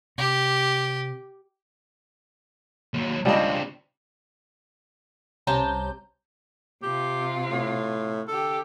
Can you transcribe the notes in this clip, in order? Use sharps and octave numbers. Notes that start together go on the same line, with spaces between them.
C3 G4
D#2 F#3
C#2 C#3 G3 C4 D4 D#5
C2 C3 C#4 A5 A#5 G6
C3 F4 G4
A2
D3 G4 A4